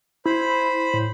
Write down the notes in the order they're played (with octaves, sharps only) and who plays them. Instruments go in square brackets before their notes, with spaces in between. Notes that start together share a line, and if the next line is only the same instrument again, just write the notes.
[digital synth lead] E4 [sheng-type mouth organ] C5 B5
[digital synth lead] A2